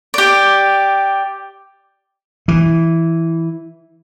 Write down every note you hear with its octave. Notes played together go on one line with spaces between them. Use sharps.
G4 D5
E3